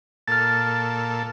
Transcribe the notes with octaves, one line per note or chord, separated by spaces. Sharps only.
A#2 A4 F6 A6